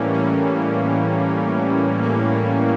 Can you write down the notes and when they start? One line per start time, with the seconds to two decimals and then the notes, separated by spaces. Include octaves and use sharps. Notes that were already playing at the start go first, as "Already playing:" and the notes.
Already playing: A2 E3 G3 A#3 C#4
0.13 C#4
2.02 A#3